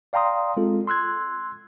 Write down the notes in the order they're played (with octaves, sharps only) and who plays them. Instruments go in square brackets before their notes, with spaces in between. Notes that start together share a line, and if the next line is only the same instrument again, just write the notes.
[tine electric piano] D5 F5 G5 A#5 C6 D#6
G#3 C4 F4 A4
C6 E6 F#6 G#6